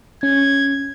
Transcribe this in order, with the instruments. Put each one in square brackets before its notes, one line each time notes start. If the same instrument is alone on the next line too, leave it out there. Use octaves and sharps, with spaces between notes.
[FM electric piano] C#4 [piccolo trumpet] G#6